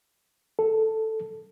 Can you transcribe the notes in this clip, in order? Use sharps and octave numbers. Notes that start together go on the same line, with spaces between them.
A4